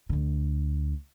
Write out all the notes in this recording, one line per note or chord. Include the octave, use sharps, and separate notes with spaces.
D2 D3